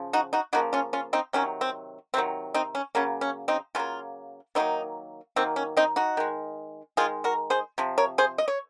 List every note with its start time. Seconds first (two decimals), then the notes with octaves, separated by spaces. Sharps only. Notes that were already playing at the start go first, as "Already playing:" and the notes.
Already playing: C#3 F3
0.13 D#4 F#4
0.33 D#4 F#4
0.53 C#3 F3 A#3 D#4 F#4
0.73 C#4 F4
0.93 C#4 F4
1.13 C4 D#4
1.33 C3 D#3 F#3 C#4
1.61 C4
2.14 C3 D#3 F#3 C4
2.54 C4 D#4
2.75 C#4
2.95 C#3 F#3 A#3 C#4
3.21 C#4
3.48 C4 D#4
3.75 C#3 F#3 A#3 C#4 F4
4.55 D#3 F#3 A#3 C4 D#4
5.36 D#3 F#3 A#3 C4
5.56 C#4
5.77 C4 D#4
5.96 D#4 F#4
6.17 D#3 G#3
6.97 D#3 G#3 F4 G#4
7.24 F#4 A#4
7.50 G#4 C5
7.78 C3 F3
7.98 A#4 C#5
8.18 G#4 C5
8.38 D#5
8.48 C#5